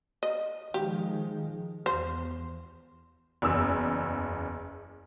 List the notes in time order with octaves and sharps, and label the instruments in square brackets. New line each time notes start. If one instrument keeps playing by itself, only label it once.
[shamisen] D#5
[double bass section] D#3 F3 G#3 [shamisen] G4
[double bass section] E2 [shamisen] C5
[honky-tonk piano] F#1 E2 E6